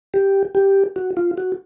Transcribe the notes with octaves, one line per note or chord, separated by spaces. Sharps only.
G4
G4
F#4
F4
F#4